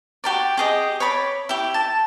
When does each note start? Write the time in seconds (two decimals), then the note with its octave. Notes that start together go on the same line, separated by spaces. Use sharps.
0.24 F#4 G4 A#4 D5
0.57 G4 G#4 D#5
1.00 C#5 D5 B5 D6
1.49 E4 G4
1.74 A5